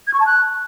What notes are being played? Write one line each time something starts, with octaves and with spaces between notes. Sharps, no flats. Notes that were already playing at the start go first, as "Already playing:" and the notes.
G#6
C#6
A5
F#6